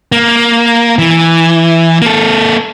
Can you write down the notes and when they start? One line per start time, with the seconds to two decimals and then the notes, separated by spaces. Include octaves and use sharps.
0.12 A#3
0.99 E3
2.02 A#3 A4